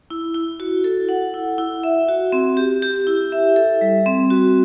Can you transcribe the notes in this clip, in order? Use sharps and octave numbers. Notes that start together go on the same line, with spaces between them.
E4
E4
F#4
A4
F#5
E4
E4
E5
F#4
C4
G4
G4
E4
E5
A4
G3
C4
F#4